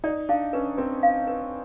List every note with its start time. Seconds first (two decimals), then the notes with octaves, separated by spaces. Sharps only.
0.04 D#4 D5
0.29 D4 F5
0.53 C#4 B4
0.78 C4 B4
1.03 F5
1.27 B4